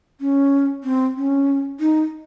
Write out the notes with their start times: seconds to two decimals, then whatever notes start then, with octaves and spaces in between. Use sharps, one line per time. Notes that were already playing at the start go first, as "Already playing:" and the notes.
0.21 C#4
0.84 C4
1.16 C#4
1.80 D#4